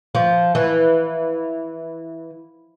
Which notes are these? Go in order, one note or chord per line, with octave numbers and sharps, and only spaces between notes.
F3
E3